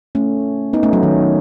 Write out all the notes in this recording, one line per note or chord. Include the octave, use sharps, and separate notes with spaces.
A3 C#4
B3 D#4
A3 C#4
F#3
D#3